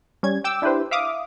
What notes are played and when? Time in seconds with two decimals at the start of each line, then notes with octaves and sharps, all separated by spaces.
0.23 G3 C#4 G#6
0.44 G5 D6 E6
0.62 D4 E4 G4 B4 C5
0.91 E5 F5 D6 D#6